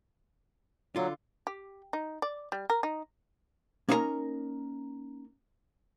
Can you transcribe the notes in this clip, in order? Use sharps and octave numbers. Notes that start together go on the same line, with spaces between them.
D3 F#3 F4
G4
D#4
D5
G3
A#4
D#4
A#3 C#4 D#4 E4 A#4 A#5